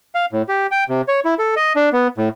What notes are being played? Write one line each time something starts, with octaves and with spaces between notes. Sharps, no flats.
F5
A2
G4
G5
C3
C#5
E4
A4
D#5
D4
B3
A2